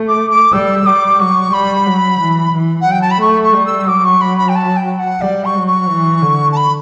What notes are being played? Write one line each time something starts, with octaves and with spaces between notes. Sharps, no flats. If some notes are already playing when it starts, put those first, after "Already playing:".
Already playing: A3
D6
D6
G3 E6
G3 D6
F#3 C#6
G3 B5
F#3
E3
E3
F#5
F#3 G5
A5
B5
A3 C#6
C#6
G3
E6
F#3 D6
C#6
B5
B5
G5
A5
G5
F#5
G3 D5
C#6
F#3
C#6
E3
D3
A5
B5